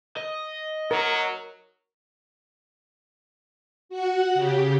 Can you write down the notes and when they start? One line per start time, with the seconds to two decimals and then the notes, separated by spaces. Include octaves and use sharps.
0.17 D#5
0.91 F#3 A#4
3.89 F#4 F#5
4.35 C#3 G4